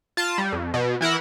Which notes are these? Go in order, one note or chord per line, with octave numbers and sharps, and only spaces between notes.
F4 A5
G3
F2
B2
E3 E4 A#4 F#5